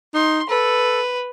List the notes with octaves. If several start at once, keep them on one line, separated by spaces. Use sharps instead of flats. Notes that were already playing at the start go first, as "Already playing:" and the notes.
D#4 C6
A4 B4